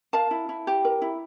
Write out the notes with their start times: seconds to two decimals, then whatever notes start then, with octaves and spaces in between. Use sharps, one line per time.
0.13 A#4 F5 A5
0.31 E4
0.49 E4
0.67 G4
0.85 A#4
1.02 E4